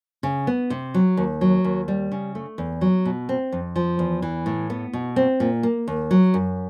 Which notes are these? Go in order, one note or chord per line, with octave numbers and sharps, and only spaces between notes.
C#3
B3
C3
F#3
D#2
F#3
D#2
G3
C#3
A3
E2
F#3
B2
C4
F2
F3
E2
E3
A2
B3
B2
C4
A#2
A#3
D#2
F#3
F#2